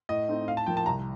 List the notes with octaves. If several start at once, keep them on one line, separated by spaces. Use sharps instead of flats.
A2 D#5
A3 C4 D#4
A2 F5
A5
F3 A#3 G5
A5
C2 A#5